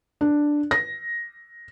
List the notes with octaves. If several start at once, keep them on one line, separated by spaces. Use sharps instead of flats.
D4
A#6